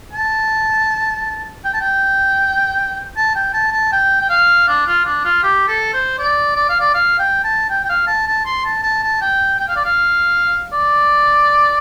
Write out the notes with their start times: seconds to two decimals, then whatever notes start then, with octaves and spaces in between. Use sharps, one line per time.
0.13 A5
1.65 G5
1.73 A5
1.81 G5
3.16 A5
3.35 G5
3.53 A5
3.72 A5
3.92 G5
4.21 G5
4.30 F5
4.68 D4
4.87 F4
5.05 D4
5.24 F4
5.43 G4
5.68 A4
5.93 C5
6.19 D5
6.56 D5
6.69 F5
6.80 D5
6.94 F5
7.19 G5
7.44 A5
7.69 G5
7.84 G5
7.89 F5
8.07 A5
8.27 A5
8.45 C6
8.65 A5
8.83 A5
9.03 A5
9.21 G5
9.59 G5
9.68 F5
9.76 D5
9.85 F5
10.72 D5